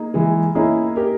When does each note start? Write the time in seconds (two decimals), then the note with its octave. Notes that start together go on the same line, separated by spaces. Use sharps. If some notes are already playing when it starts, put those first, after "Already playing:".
Already playing: A#3 D#4 G#4
0.14 E3 G#3
0.55 A#3 C#4 D#4 E4 G#4
0.96 G4 A#4